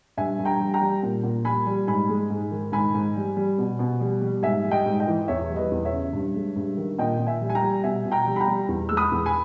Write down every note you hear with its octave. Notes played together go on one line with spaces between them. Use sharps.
G2 E5 G#5
G2
G5 A#5
G3
G5 A#5
G3
A#2
A#2
G3 G#5 B5
G3
G#2 G#5 B5
G#3
G#2
D#3
G#2 G#5 B5
G#2
G3
G3
B2
B2
G3
G3
G#2 E5 G#5
G3
D#5 G5
G#2
D#5 G5
E3
E2 C#5 E5
G3
B4 D#5
E2
C#5 E5
C#3
G2
G#3
G2
D#3
A#2 D#5 G5
A#2
E5 G#5
G3
G#5
G5 A#5
G3
B2 E5 G#5
B2
G5 A#5
G3
B5
G5 A#5
G3
E2
G#3 E6
B5 D#6
E2
G#5 B5